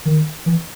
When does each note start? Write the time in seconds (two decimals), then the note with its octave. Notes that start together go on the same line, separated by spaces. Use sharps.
0.05 D#3
0.46 E3